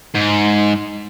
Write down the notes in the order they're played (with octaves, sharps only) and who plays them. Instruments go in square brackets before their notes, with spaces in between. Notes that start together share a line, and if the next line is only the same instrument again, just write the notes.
[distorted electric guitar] G#2